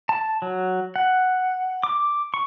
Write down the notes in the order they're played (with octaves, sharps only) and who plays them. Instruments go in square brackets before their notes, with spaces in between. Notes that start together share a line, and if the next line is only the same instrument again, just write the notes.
[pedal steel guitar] A5
F#3
F#5
D6
C#6